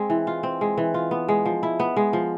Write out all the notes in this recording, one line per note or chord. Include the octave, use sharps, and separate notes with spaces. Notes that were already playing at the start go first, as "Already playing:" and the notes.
Already playing: G#3 C4
E3
F4
C4
G#3
E3
F4
B3
G#3
F3
E4
B3
G#3
F3